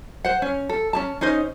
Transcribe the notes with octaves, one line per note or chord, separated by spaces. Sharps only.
C5 F#5
C#4
A4
C#4 G#4 A5
C#4 D#4 C5 D#5